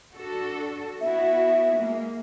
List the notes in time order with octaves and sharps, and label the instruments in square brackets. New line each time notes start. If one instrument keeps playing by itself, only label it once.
[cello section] D4 F#4 A4
[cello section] B3 E4 F#4 [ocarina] E5
[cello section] G#3 A#3